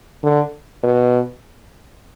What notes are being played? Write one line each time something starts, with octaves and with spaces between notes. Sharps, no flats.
D3
B2